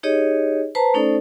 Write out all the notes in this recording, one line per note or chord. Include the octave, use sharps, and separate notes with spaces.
D#4 G4 G#4 C#5 D#5
B4 C5 A5 A#5
A3 C#4 D#4 A4 C5 D5